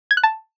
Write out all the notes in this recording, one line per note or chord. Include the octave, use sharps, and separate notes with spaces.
G#6
F#6
A5